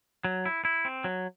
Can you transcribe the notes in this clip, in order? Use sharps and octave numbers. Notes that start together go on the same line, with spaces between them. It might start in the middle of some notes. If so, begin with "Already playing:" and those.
F#3
E4
E4
C4
F#3